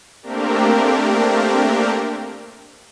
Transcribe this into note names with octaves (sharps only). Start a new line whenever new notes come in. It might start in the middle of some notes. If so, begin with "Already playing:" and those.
A3 A#3 C4 D4 G4 A#4